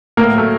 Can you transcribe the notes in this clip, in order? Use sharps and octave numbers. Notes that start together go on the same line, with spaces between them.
A2 A#3 A#4
F#3 A3